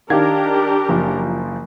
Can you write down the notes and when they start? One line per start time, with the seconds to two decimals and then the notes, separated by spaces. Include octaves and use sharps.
0.10 D#3 D4 G4 A#4 F5 G#6
0.89 F#1 F3